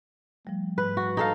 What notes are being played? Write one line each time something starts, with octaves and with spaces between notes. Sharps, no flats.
F3 G3 A3
G#2 B4
F#4
D#4 A4 F5